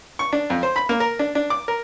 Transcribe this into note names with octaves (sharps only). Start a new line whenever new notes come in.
C#6
D4
F2
C5
B5
A#3
A#4
D4
D4
D6
A#4